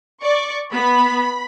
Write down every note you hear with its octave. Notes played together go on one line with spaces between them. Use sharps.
D5 C#6
B3 B5